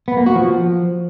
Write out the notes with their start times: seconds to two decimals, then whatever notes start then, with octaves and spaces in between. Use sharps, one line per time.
0.08 B3
0.17 A#3
0.26 F#4
0.35 F3